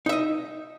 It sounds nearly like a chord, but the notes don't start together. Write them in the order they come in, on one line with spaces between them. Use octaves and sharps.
D#4 E5 D#5